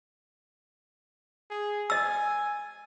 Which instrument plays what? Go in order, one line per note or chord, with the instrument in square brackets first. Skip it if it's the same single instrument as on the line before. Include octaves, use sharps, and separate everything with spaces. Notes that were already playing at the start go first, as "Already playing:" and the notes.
[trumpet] G#4
[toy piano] D#5 E6 [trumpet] G#5